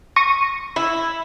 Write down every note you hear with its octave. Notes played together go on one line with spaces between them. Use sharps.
C#6 A#6 D#7
E4